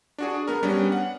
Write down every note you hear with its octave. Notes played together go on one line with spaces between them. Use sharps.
D4 F#4 G#4
B3 A#4
G3 B3 C#4 D4
F#5